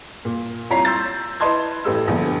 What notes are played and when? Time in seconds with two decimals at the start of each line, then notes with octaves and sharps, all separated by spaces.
0.25 A#2
0.70 C2 F4 C#5 A#5 B6 C7
0.85 C6 E6 G6 A6
1.40 E4 B4 D#5 A5 C6 G#6
1.84 A1 A3 G4 B4 E6
2.07 A#1 D3 B3